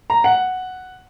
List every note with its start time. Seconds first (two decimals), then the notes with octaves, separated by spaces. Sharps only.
0.10 A#5
0.24 F#5